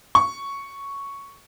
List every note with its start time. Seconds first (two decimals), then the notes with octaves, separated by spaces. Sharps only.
0.15 C#6